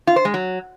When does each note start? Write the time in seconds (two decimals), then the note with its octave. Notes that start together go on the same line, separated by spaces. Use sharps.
0.07 F4
0.16 C5
0.25 G#3
0.34 F#3